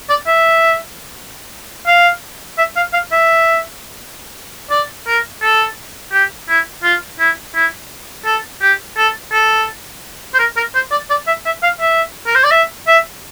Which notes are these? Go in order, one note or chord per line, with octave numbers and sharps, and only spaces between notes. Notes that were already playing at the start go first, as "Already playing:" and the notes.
D5
E5
F5
E5
F5
F5
E5
D5
A#4
A4
G4
E4
F4
E4
E4
A4
G4
A4
A4
C5
A#4
A#4
C5
D5
D5
E5
E5
F5
E5
A#4
C5
D5
E5
E5